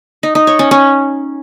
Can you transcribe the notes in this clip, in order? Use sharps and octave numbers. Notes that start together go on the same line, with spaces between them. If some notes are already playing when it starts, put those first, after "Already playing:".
D#4
D#4
C#5
C#4
C#4